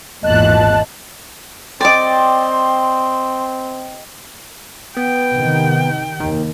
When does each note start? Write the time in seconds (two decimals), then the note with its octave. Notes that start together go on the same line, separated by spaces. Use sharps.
0.23 G#1 E2 A#2 D#5 A5 F#6
1.81 C4 D5 D#5 G5 C6 D6
4.97 B3 G5
5.33 C3 D#3
6.20 D#2 D#3